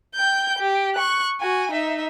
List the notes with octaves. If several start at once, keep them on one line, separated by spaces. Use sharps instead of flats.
G5 G6
G4
C#6 F#6
F#4 G#5
D#4 E5